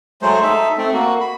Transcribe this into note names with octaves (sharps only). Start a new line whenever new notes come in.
F#3 G#3 A3 C5
D#4 A4 E5
A3 C4
A#3 F#4
B5